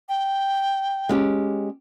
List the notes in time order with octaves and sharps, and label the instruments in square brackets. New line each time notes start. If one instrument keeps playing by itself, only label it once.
[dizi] G5
[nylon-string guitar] G#3 C#4 G4